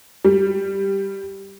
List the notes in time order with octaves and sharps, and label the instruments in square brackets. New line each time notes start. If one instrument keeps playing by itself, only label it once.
[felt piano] G3